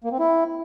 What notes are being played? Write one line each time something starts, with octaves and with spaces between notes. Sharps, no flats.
A#3
C4
E4